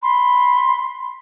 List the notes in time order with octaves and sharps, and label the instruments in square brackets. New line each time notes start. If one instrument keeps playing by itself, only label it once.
[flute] B5 [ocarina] C6